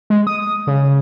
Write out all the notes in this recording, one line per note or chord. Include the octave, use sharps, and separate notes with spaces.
G#3
D#6
C#3